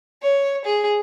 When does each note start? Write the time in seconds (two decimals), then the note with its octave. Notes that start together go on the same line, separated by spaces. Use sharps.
0.22 C#5
0.65 G#4